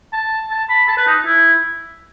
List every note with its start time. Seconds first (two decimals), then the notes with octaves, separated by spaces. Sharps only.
0.13 A5
0.51 A5
0.70 B5
0.88 A5
0.98 B4
1.07 D#4
1.26 E4